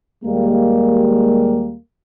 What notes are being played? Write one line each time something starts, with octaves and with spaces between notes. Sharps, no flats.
D#2 G3 G#3 A#3